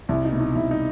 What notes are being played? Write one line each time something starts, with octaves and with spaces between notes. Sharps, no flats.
C2 E4
D#4
B2
D#4
C2 E4
D#4